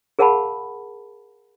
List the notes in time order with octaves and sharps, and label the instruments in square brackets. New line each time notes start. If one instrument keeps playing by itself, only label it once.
[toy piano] G#4 A#4 F5 F#5 A5 B5